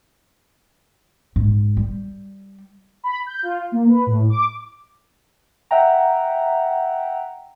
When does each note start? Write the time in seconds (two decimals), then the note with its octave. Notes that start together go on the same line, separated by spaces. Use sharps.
1.36 G#2
1.77 G3
3.04 B5
3.26 G6
3.43 F4
3.72 A#3
3.87 B4
4.06 A2
4.30 D6
5.71 E5 F#5 G5 A#5